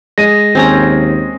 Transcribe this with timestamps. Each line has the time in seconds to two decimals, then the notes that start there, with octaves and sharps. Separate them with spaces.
0.18 G#3 D#5 A#6 D#7
0.55 D#2 C4 C#4 A#5